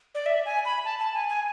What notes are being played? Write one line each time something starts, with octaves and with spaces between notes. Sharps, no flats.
D5
E5
G#5
B5
A5
A5
G#5
G#5